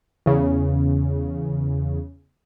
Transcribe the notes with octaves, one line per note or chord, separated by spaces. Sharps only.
E2 C#3